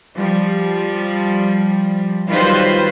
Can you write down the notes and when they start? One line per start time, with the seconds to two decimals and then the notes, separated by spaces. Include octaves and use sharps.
0.17 F3 G3
2.28 D#3 F#3 G3 F4 B4 C5